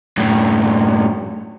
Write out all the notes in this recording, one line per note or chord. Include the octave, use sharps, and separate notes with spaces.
F#2 A2